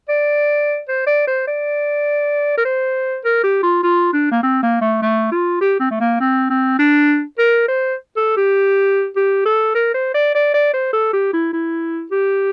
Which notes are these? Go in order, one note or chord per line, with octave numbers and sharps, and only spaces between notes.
D5
C5
D5
C5
D5
A#4
C5
A#4
G4
F4
F4
D4
A#3
C4
A#3
A3
A3
F4
G4
C4
A3
A#3
C4
C4
D4
A#4
C5
A4
G4
G4
A4
A#4
C5
D5
D5
D5
C5
A4
G4
E4
E4
G4